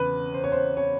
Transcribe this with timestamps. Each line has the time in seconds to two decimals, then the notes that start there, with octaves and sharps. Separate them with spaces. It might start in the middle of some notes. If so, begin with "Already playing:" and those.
Already playing: E2 C#3 B4
0.34 C5
0.44 C#5
0.52 C5
0.77 C#5